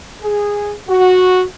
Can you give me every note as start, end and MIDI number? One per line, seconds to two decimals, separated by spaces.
0.22 0.72 68
0.88 1.43 66